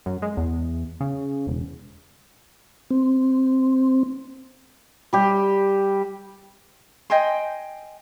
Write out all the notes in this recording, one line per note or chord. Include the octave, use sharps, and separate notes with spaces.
F#2
G#3
E2
C#3
E1
C4
G3 G4
D#5 G5 G#5 C6